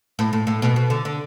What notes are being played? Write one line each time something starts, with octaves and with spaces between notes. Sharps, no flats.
A2
A2
A2
B2
B2
D3
D3